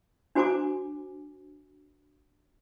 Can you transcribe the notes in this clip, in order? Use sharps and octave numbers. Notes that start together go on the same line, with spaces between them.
D4 F#4 C5 G#5 A#5 D6